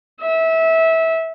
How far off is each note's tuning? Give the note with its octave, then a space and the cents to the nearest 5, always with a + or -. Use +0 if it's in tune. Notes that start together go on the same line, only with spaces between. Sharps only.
E5 -20